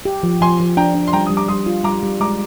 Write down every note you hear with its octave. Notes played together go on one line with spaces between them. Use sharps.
G4
F3
F3 G#5 C6
F3
D4 G5 A#5
D4
C6
G3 G5 A#5
G3 D#6
A#5 D6
G3 C6 D#6
F4
G3 A#5 D6
G3
G#3 A#5 D6